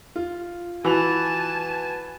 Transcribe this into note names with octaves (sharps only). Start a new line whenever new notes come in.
F4
E3 F#4 B4 G#5 A5 F7